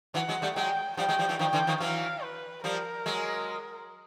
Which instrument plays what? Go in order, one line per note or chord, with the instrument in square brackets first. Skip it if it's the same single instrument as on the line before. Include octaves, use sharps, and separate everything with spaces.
[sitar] E3 F#3 [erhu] F#5
[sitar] F#3 G#3
G3 A3
[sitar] F#3 G#3 [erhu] G5
[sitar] F3 G3 [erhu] G5
[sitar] F#3 G#3
F3 G3
E3 F#3
[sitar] D#3 F3 [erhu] G5
[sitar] D3 E3
D#3 F3
[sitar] E3 F#3 [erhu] F5
[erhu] B4
[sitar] F3 G3 [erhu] A#4
[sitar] F#3 G#3